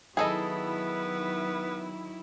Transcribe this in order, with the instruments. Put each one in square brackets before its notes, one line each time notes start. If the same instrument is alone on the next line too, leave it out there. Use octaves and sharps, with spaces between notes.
[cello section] D#3 F#3 E4 [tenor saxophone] B3 [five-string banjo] G#4 A4 D#5